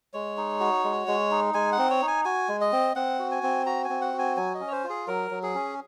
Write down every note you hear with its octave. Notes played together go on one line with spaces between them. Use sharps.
G#3 C#5
D#4
F#4
G#3
G#3
D#4
G#3 G#5
F#5
C4
C#5
D#4
G#5
F#4 G#5
G#3
D#5
C4
C4 F#5
F#4
G#5
C4
F#4 A#5
G#5
C4
F#5
F#4
G#5
F#3 G#5
D#5
C#4
C#5
C5
F4
G#4
F#3 A#4
F#3
G#4
C#4